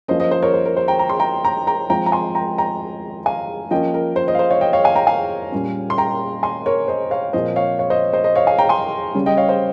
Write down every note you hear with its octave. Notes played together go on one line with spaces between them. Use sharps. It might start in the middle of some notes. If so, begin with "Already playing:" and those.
F3 A#3 C#4 C5 D#5
C5 D#5
C5 D#5
A#4 C#5
C5
A#4
C5
G5 A#5
A#5
C6
G5 A#5
G5 A#5
G5 A#5
F3 G#3 C4 G5 A#5
A#5
G#5 C6
G5 A#5
G5 A#5
F5 G#5
F3 A#3 C#4 D#5 G5
A#4
C5
C5 D#5
F5
C5 D#5
C#5 F5
D#5 G5
C#5 F5
F5 G#5
G5 A#5
F5 G#5
A#2 G3 A#3 C#4
C6
G5 A#5
G#5 C6
A#4 C#5
C5 D#5
C#5 F5
A#2 F3 C4 C5 D#5
C#5 F5
C#5 F5
C5 D#5
C5 D#5
C5 D#5
C#5 F5
F5 G#5
G5 A#5
G#5 C6
C#3 G3 C#4
D#5 G5
C#5 F5
C5 D#5